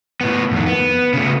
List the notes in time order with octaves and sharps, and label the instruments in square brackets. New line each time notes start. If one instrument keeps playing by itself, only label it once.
[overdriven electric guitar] A2 B3
F2 D#3
B3
C#3 A3